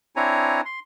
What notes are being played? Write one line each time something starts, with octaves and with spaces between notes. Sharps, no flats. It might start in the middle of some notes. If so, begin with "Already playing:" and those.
C4 D4 E4 C#5 G#5 A#5
C6